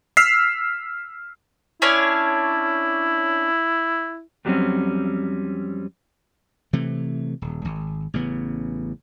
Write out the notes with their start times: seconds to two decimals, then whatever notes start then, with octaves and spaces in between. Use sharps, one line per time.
0.17 E6 F6 B6 C7
1.82 C#4 D4 E4 C#5
4.45 F2 F#3 G3 A#3 C4 C#4
6.73 C3 E3 A3
7.42 D#1
7.65 G#1
8.14 A1 C#3 B3